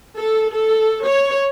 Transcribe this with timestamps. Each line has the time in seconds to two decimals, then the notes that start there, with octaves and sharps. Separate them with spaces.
0.18 A4
0.51 A4
1.03 C#5